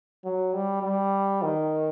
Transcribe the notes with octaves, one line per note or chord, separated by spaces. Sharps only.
F#3
G3
G3
D#3